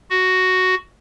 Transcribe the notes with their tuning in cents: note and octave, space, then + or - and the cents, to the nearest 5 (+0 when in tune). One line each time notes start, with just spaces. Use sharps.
F#4 +5